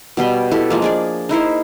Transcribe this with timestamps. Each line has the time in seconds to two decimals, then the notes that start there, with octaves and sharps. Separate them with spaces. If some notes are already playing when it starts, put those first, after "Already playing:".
0.17 B2 G3 B4 G5
0.52 E4 G4 A4
0.70 F3 G#3 A#3
0.82 D4 G#4 D5
1.29 D#4 E4 A#4 C5